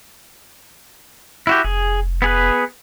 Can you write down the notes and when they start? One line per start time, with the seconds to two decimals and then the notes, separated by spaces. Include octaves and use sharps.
1.47 E4 F#4 G4
1.64 F1 G#4
2.22 B3 G#4 B4